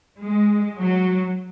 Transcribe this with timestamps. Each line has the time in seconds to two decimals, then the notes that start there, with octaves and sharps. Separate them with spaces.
0.22 G#3
0.77 F#3